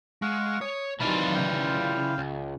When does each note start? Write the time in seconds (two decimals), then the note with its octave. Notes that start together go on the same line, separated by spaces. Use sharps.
0.22 G#3 F5 F#5 C#6
0.61 C#5 D#6
1.00 C3 D#3 E3 F#3 F4 D5 A5 B5
1.35 C#3 F5 G5
2.18 C#2